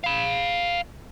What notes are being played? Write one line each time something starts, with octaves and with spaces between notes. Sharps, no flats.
F5 B5